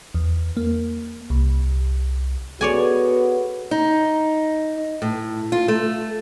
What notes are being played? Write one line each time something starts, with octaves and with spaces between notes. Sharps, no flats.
E2
A#3
C2
B3 F#4 G#4 A4 C#5 D5 G#5
D#4
A2
F4
A3